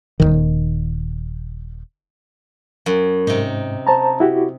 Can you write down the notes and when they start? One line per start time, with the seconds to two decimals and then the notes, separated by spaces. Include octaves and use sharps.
0.20 D#1 B1 D#3
2.86 F#2
3.27 G#2 C3 D#4
3.87 C5 A5 A#5
4.20 E4 F#4 G4